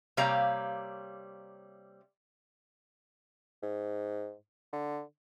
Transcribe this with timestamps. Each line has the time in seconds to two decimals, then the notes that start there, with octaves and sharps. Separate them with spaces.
0.17 C3 G3 A#3 C#5 F5 A#5
3.63 G#2
4.73 D3